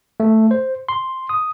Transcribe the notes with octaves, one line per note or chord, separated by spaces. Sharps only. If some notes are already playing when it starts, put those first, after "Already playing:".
A3
C5
C6
D#6